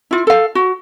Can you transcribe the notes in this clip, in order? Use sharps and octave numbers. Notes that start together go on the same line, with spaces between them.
E4 F4
A4 F5
F#4